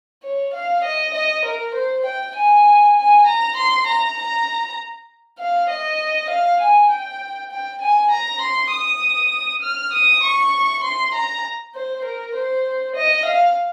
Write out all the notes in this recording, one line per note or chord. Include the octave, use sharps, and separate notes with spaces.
C#5
F5
D#5
D#5
A#4
C5
G5
G#5
G#5
A#5
C6
A#5
A#5
F5
D#5
F5
G#5
G5
G5
G#5
A#5
C6
D#6
F6
D#6
C#6
C6
A#5
C5
A#4
C5
D#5
F5